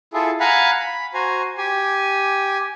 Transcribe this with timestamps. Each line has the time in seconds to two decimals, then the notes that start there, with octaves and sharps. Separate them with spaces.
0.14 E4 F4 G#4 A4
0.40 F5 F#5 G#5 A#5 B5
0.79 B5
1.14 F#4 C5 G#5 A#5
1.58 G4 G#5